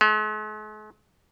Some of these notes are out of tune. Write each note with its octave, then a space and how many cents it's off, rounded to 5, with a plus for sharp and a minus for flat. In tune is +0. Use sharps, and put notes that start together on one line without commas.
G#3 +45